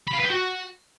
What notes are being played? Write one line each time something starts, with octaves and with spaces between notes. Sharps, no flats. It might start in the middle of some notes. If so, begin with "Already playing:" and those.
B5
F5
B4
G5
F#4